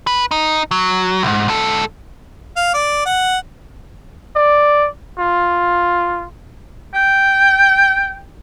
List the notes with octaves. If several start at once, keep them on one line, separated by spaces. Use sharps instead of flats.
B4
D#4
F#3
B1 G#2
G#2 A4
F5
D5
F#5
D5
F4
G5